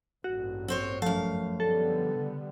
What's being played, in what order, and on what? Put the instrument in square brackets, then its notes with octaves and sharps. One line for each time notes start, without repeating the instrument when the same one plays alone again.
[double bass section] A1 G2 A#2 [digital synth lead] F#4
[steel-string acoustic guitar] C4 C5 C#5
[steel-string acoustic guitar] F#2 F5 [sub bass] F3 [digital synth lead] A3
[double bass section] D3 G3 B3 [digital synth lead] A4
[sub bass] C#3